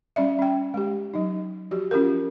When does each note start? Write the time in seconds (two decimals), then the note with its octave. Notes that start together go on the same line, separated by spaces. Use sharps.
0.16 G3 C#4 D5 E5
0.39 C#4 G5
0.74 G#3 G4
1.14 F#3 D#4
1.71 F3 F#4 G4
1.91 C#4 F4 G4 A#4